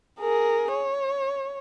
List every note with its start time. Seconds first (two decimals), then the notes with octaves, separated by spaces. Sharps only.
0.19 G#4 A#4
0.73 C#5